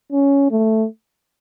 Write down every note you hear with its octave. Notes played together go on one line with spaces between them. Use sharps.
C#4
A3